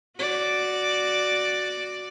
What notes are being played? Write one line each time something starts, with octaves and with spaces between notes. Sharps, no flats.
F#4 D5